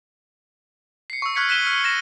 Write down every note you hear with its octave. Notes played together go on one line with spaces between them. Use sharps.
C7 C#7
C#6 E6
C#6 F6 F#6 G#6 B6 C#7
F#6 B6 D#7 E7 G7
F6
F6 A#6 C#7 E7